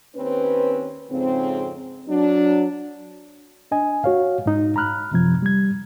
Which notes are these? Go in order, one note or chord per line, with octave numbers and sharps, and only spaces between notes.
D#2 C4 C#4 B4
F2 G#2 C#3 C4
F#3 D4
D4 D#5 G#5
F#4 C#5 F5
G#2 D#4
A#5 B5 F6 F#6
F#2 C3 F3 G#6
G3 G#6